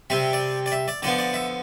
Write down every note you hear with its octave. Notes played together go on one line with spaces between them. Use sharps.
C3 G3 C4 E5
D5
D5
E5
D5
D3 F3 B3 D5
D5
E5